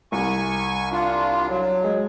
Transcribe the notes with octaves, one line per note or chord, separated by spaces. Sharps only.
C2 G#5 C#6
D4 F4
F#3
G#3